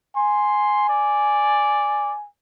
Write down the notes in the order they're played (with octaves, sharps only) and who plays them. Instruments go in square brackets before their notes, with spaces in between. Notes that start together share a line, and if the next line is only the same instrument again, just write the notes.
[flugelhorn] G#5 [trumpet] C6
[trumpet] D5